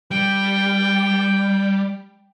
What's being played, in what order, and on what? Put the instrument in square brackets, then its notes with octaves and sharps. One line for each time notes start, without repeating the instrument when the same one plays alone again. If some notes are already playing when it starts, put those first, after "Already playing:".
[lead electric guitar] G3 [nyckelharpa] G5